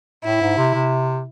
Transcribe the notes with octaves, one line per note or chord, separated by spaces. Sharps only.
A2 E4
G#2
C3
C3